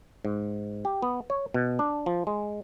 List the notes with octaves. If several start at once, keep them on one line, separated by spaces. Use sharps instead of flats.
G#2
G4
B3
C#5
B2
D4
F3
G#3